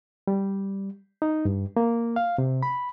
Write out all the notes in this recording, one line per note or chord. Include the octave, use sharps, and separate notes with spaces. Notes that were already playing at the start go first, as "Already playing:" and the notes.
G3
D#4
G2
A#3
F5
C3
B5